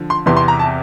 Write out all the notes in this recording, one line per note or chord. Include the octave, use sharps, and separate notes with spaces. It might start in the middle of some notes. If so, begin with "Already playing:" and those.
Already playing: D3 F3
C6
E2 C3 E3 C6
C6
A#5
A5